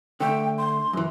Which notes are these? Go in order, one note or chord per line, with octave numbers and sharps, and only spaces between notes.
D3 A3 G5
C6
F#2 E3